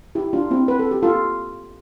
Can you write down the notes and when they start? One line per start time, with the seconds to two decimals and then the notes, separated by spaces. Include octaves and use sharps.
0.15 E4 G4
0.33 D4 F4
0.51 C4 E4
0.68 B4
0.79 A4
0.91 G4
1.03 F4 A4